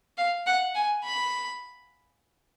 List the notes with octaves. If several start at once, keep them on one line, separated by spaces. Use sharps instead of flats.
F5
F#5
G#5
B5